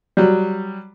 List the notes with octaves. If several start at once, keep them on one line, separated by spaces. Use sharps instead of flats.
F#3 G3